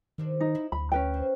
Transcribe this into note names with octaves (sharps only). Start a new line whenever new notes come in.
G2 C3 D#3 D4
D#4
E4
D2 B5
C#4 B4 G5
F3